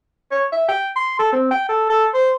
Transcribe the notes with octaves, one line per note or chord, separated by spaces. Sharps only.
C#5
E5
G5
C6
A4
C4
G5
A4
A4
C5